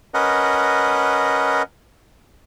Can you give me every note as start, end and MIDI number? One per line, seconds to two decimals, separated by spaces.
0.14 1.62 61
0.14 1.62 70
0.14 1.62 71
0.14 1.62 75
0.14 1.62 78